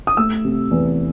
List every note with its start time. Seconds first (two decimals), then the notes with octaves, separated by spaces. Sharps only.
0.07 D#6
0.17 A3 E6
0.45 C3
0.71 E2